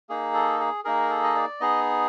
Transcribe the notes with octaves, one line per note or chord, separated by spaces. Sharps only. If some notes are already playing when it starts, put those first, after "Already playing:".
A#3 D#4 G#4
A4
G#4
A#3 D#4 G#4 A#4
A4
D#5
D5
B3 D#4 G#4 D#5